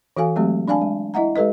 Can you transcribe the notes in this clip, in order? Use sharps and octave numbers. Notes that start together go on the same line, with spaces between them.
E3 F#4 A4 F5 G#5
F#3 G#3 A3 C4 G4
D4 D5 F5 G#5 A5
G#3
E4 D#5 E5 F#5 A#5
G#3 G4 A4 B4 D#5